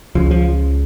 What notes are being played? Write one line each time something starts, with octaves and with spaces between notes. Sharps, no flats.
C#2 C#3 F3
F3